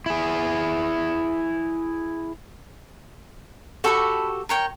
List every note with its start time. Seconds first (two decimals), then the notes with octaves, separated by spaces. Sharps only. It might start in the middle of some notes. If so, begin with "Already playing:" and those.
0.06 E4 G#4
3.84 F#4 G4 A4 F#5 B5 C#6
4.49 A#4 C#5 G5